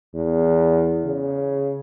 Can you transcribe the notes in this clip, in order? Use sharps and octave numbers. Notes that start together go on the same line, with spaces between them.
E2
C#3